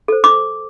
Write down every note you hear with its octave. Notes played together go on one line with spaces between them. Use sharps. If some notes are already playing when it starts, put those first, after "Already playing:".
A4 C5
D6